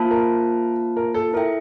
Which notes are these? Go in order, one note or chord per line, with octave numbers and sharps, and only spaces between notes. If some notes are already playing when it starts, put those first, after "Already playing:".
Already playing: A#3 F4 C5 F5 A5
A#4
A#4
A4
E4 A4 A#4 E5 G5